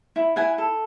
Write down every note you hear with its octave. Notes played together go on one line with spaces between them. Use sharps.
E4
E4 F#5 G#5
A4